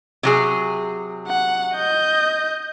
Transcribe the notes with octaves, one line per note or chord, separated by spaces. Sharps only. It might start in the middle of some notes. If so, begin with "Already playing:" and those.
C3 F#3 G#4
F#5
D#5 G6